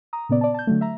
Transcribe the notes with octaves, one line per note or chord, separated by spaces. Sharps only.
A#5 D#6
A#2 C#3 B3 D5
D5 A5
A5 G6
D3 F#3 A3
E5 A#5